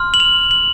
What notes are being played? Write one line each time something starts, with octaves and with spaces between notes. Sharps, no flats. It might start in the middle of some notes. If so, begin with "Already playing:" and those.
Already playing: C6 F6
F#7
F7
F#7